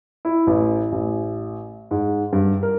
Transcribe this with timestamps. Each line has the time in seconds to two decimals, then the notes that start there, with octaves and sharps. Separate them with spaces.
0.25 E4
0.47 A1
0.92 A1
1.91 G#2
2.33 G2
2.63 A#4